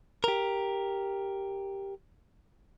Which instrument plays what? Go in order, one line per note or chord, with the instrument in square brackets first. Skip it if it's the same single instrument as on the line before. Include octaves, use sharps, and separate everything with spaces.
[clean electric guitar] G4 A#4